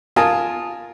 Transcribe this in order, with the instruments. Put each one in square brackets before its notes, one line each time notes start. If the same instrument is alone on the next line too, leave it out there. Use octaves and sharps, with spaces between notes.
[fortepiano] F4 A#4 G#5 A5 D#6